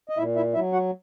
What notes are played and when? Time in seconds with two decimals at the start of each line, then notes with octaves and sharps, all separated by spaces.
0.09 D#5
0.17 A#2 E4 E5
0.36 E4 E5
0.54 F#3 E4 E5
0.72 F#4 F#5